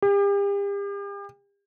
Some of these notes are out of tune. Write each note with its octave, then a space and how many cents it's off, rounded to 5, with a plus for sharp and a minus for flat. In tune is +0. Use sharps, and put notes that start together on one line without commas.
G4 +40